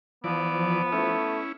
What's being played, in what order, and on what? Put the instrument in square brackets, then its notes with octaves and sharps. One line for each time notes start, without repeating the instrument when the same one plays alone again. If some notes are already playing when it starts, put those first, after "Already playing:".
[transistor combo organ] E3 D5 [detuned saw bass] F3 [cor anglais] B3
[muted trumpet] A3 [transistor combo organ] C#4 E4